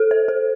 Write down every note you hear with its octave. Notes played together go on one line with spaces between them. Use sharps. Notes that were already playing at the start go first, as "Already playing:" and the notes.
Already playing: A4
C5
A4